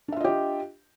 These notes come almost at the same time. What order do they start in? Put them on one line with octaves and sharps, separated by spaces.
D4 E5 F4 D#5 G4